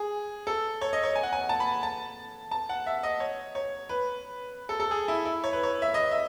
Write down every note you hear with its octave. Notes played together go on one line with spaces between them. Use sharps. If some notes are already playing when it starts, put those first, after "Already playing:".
Already playing: G#4
A4
C#5
D#5
C#5
G#5
F#5
G#5
A5
B5
A5
A5
F#5
E5
D#5
C#5
C#5
B4
A4
A4
G#4
E4
E4
C#5
B4
C#5
E5
D#5
E5